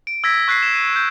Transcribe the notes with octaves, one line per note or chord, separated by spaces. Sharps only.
D7
E6 G#6 A#6 B6
C#6 F#6 B6 C7
E7
D#7
G6